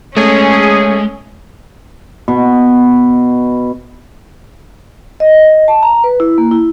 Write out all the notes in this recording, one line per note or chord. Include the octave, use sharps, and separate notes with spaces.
G#3 A3 C#4 G#4 C#5
B2
D#5
A5
A#5
B4
E4
A#3
E4